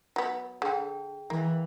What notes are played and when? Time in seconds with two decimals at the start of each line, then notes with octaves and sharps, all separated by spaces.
0.16 F#3 B3
0.62 D3 G#4 G5
1.30 E3 A#3